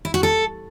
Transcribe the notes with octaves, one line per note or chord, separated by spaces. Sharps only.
E4
F#4
A4